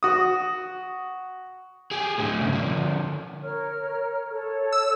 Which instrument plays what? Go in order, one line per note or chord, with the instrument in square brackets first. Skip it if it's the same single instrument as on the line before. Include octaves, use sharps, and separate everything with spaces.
[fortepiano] F#4 D#6
[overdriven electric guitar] G4 G#4
A2 D3
G2 C#3
D3 F3
[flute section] A#4 C#5 F6
A4 C#5
[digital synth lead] E6